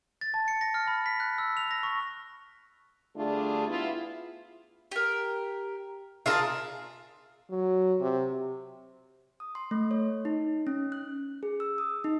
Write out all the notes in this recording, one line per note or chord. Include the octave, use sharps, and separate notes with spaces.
A6
A5
C#7
A#6
F6
B5
B6
F#6
E6
F7
A#6
C#6
D3 G3 A3 D4 F4 G#4
B3 E4 F4
G4 A#4
F4 G#4 A#4 E5 A5
F#3
C3
D#6
C6
A3
C#5
D#4
C#4
F#6
G#4
E6
D#6
D#4